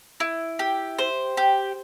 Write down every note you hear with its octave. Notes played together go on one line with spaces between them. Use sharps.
E4
G4
C5
G4